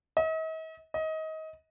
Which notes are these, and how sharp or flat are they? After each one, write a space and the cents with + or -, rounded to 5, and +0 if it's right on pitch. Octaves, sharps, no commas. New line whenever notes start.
D#5 +45
D#5 +25